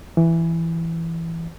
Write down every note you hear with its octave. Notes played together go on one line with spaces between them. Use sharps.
E3